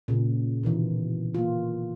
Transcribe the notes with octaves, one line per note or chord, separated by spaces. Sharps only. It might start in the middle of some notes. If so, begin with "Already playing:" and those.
A#2 C#3
B2 D#3 E3
A#3 F4